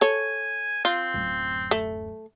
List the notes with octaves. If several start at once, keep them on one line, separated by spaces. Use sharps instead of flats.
A4 C#5 G#5
C4 F4
D1 F#2
A3